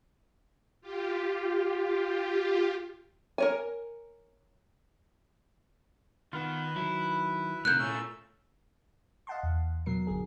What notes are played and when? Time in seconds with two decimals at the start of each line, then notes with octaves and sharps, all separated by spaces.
0.81 F4 G4
3.38 A#4 C#5 G#5
6.33 D#3 B3 F4 B4
6.76 D#3 F#3 E4
7.65 A2 C3 D#3 A#4 F5 F#6 G6
7.79 A#2 A3 C#4 E6
9.27 D#5 F5 F#5 A5 C6
9.43 E2
9.86 B2 F#3 A#4 C7
10.07 G#1 D3 G#4